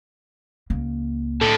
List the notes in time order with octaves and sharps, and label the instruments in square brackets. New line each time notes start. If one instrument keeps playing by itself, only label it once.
[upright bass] C#2 A#3
[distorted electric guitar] A2 D3 [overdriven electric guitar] A4